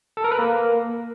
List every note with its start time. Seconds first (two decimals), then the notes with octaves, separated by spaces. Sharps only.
0.17 A4
0.24 A#4
0.32 B4
0.39 A#3